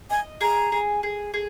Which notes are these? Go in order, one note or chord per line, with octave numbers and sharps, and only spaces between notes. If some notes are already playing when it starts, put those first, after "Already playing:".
D#5 G#5
G#4 A#5
G#4
G#4
G#4